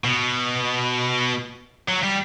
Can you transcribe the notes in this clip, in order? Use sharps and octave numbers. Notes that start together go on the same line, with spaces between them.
B2
F#3
G3